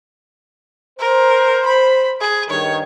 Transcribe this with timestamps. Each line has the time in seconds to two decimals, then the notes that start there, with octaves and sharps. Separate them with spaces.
0.99 A#4 C5
1.66 B5
2.21 G#4
2.50 G2 D#3 C#5